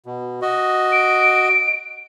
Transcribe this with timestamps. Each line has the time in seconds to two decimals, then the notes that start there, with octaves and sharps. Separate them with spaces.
0.06 B2
0.42 F#4 D#5
0.92 D7